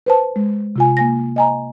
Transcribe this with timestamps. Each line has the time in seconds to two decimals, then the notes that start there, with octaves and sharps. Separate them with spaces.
0.06 B4 C5 A5
0.36 G#3
0.76 C3 F4 G#5
0.97 A#3 G#5 A#6
1.36 D#5 G#5 A#5